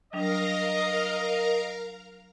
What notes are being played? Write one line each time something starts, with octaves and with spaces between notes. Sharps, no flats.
F#3 G3 D4 A#4 D#5 F5 A#5